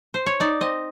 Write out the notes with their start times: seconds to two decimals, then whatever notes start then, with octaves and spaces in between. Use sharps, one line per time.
0.14 C5
0.26 C#5
0.40 D#4 D5
0.61 C4 D#5